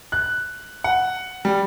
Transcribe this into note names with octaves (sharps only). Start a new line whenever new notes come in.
F#6
F#5
G3